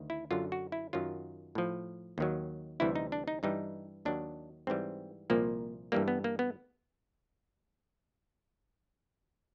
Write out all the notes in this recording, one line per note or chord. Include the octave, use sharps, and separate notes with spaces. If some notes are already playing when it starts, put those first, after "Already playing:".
Already playing: D2 D#3
E4
F#2 D3 F#3 F4
F#4
E4
F#2 D#3 F#3 F4
A2 F3
D#2 D#3 F#3
D2 C3 E3 G3 E4
D#4
D4
D#4
G2 E3 G3 D#4
D#2 D#3 F#3 D4
G#2 E3 G3 C4
C2 A#2 F3 A#3
G2 E3 G3 A#3
B3
A#3
B3